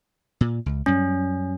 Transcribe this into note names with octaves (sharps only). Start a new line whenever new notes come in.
A#2
C#2
F#2 G3 C#4